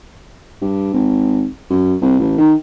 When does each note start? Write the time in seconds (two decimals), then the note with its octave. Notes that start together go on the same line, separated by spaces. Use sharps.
0.62 G2
0.94 G#1
1.70 F#2
2.01 C2
2.20 A1
2.38 D#3